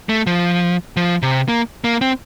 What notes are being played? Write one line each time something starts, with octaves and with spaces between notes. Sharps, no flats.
A3
F3
F3
C3
A#3
A#3
C4